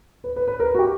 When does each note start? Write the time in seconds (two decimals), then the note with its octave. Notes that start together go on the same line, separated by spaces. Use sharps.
0.24 B4
0.36 B4
0.48 B4
0.60 A#4
0.75 F#4
0.79 G4